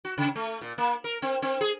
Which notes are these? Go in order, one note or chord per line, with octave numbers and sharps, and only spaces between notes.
F#4
C#3
A3
A#2
A#3
A#4
C4
C4
G#4